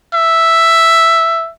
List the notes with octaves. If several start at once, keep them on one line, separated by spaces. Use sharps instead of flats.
E5